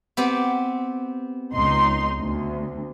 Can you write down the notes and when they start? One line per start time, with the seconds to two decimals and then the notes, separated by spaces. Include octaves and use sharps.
0.17 B3 C4 G4
1.53 C#2 D#4 C6
2.20 D2